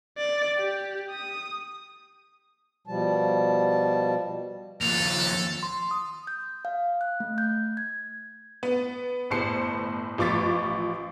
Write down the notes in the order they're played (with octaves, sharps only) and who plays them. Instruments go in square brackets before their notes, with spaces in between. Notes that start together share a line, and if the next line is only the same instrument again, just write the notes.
[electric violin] D5
G4
D#6
[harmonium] B2 F3 G3 A5
[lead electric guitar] D#2 F3 [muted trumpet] A4 [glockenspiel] F7
[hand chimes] C6
D#6
G6
F5
F#6
A3
G6
G#6
[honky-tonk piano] B3
G1 A2 C5 A5 C7 C#7
A1 F3 C#6 D6 A6 B6